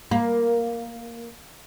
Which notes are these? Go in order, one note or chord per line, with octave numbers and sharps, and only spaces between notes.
A#3